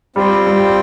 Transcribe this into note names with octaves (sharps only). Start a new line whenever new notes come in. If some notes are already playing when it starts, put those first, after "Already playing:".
G3 C4 F4 C5 G5
G3